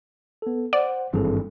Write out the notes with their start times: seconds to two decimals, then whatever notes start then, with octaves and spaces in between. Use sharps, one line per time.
0.42 B3 A4
0.73 C5 D5 F#5
1.13 G#1 G2 E3 C4 G#4 A4